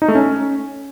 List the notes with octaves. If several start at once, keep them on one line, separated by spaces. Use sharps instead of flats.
D#4
A3
C#4